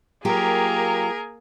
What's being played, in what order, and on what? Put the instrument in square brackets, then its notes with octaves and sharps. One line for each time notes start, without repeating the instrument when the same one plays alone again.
[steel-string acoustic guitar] F#3 F4 G4 [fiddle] A#3 [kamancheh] G#4 A#4